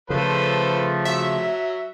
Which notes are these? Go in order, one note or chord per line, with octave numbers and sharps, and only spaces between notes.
C#3 F3 A3 A4 B4 C5
F#3 E5